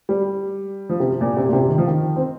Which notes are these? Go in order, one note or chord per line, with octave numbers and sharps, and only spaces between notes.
G3
F3
C3
A#2
C3
A#2
C3
D#3
F3
D#3
C4